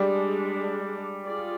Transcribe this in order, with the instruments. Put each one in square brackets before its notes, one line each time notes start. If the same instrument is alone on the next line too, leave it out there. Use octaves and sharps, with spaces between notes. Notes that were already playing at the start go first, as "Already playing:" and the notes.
Already playing: [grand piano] G3 [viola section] G#3 D4 G#4 D5
[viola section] F4 G#4 D5